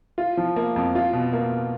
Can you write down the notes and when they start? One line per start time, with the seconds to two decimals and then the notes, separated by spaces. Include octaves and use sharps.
0.18 F4
0.37 F3
0.56 A#3
0.76 F2
0.95 F4
1.13 B2
1.33 A#3